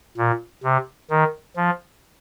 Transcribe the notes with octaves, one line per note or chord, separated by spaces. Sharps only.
A#2
C3
D#3
F3